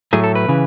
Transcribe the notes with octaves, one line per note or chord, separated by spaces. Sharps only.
A2 F#3 A3 G#4
A4
B4
C#3 E3